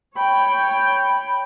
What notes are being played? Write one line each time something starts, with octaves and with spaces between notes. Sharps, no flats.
C#5 G5 B5